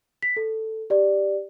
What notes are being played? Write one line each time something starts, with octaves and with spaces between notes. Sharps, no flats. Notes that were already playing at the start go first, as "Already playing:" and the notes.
B6
A4
G4 D5